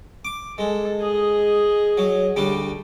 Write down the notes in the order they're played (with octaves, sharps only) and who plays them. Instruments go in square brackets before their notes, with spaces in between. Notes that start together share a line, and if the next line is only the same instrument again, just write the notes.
[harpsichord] D6
[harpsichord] G#3 [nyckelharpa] A4
[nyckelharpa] G#4 D#5
[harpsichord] F#3
D2 G3 D4